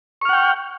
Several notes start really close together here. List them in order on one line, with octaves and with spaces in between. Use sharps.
C#6 F6 F#5 G5